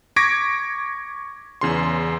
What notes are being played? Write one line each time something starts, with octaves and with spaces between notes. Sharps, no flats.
C#6 D6 G#6 A#6 B6 D7
E2 C#3 C6